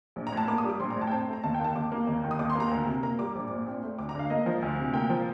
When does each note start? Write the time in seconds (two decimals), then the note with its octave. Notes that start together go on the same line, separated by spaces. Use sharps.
0.16 A#1
0.27 A#5
0.32 A2
0.37 A5
0.48 A#3 D6
0.58 D#6
0.64 G3
0.70 D6
0.80 A#1 C6
0.90 A#5
0.96 A2
1.01 A5
1.07 G5
1.12 C4 A5
1.27 A3
1.33 A#5
1.44 D#2 A5
1.54 G5
1.60 D#3 A5
1.75 D#2 D6
1.92 A#3
2.07 D#2
2.24 D#3
2.31 D#6
2.39 D#2 D6
2.50 C6
2.55 A#3 A#5
2.71 D2
2.87 C3
3.03 A#3 A#5
3.19 G3 D6
3.35 A#1
3.51 A#2
3.67 C4
3.83 A3
3.99 D2 D6
4.09 A#5
4.15 D3 F5
4.30 A#3 D#5
4.46 F3
4.62 D2
4.78 C3
4.94 A#3 G5
5.10 F3